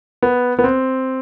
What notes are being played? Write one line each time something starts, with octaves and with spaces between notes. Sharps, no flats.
B3
B3
C4